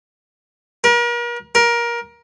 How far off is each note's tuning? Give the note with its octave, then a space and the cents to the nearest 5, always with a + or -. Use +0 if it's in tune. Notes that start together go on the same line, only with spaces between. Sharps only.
A#4 +40
A#4 +20